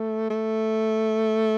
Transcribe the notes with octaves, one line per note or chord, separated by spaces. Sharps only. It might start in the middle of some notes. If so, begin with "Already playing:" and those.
Already playing: A3
A3